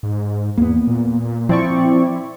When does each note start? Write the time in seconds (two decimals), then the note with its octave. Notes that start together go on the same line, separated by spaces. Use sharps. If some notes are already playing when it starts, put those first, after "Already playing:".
0.03 G#2
0.57 E2 A#3 B3
0.87 A#2
1.49 F3 C4 E4 D5 C#6